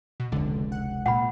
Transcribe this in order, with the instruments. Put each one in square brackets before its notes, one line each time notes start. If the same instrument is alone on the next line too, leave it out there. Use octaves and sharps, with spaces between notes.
[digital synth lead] B2
[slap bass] F1 C#2 [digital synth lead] D3
[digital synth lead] F#5
[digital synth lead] A#2 [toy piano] F#5 B5